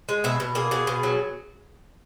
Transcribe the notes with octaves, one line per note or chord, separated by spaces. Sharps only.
G#3
B2 E5
B2
A#3 G#4
B2 G#4
B2
F#3